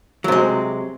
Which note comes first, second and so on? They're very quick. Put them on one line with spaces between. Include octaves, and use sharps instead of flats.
F#3 C3 G#3